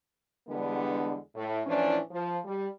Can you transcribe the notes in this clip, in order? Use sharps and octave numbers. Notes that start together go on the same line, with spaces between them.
E2 D3 G3 G#3 B3 D4
A2
A2 E3 F3 C#4 D4
F3
G3